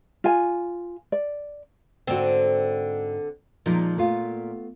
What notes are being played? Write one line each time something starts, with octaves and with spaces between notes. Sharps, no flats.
F4 G#5
D5
G#2 D3 C4 F#4
A#2 F3 G#3 D#4
A3 B3 F4